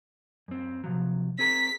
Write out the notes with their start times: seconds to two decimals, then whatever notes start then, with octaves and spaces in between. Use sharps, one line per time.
0.48 F#2 C4
0.84 C3 F3 F#3
1.39 C4 G#4 A#4 B6